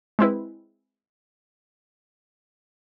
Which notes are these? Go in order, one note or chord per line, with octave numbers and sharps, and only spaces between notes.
G#3 C4 E4 B4